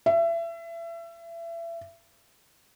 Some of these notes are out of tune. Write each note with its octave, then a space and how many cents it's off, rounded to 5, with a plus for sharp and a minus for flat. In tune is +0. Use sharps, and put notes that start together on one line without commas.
E5 +30